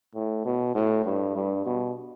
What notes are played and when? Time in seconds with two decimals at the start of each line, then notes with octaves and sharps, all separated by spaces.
0.15 A2
0.45 B2
0.75 A2
1.05 G2
1.35 G2
1.65 B2